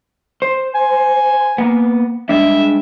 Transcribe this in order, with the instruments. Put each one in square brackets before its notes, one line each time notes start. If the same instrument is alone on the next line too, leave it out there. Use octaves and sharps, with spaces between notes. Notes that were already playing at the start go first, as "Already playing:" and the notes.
[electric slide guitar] C5
[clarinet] G#5
[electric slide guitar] A#3 B3
[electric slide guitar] G3 G#3 D4 [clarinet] E5